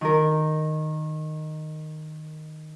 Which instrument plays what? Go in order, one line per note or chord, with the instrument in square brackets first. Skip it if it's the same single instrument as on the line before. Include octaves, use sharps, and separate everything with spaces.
[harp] D#3 A#4